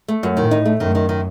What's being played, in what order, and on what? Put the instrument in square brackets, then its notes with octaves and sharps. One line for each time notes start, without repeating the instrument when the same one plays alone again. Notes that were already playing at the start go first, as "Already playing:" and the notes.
[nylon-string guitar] A3
F#2
[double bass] A2 [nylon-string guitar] D#3
[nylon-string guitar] D#4
A3
[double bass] F#2 [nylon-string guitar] D#3
[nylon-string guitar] D#3
D#3